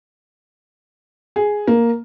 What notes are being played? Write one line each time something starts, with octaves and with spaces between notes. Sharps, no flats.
G#4
A#3